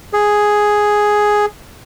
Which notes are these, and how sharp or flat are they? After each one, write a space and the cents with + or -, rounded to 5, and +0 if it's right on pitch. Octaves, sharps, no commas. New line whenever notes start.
G#4 +5